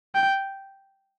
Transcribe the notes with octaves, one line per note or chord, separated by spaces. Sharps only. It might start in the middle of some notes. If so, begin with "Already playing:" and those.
G5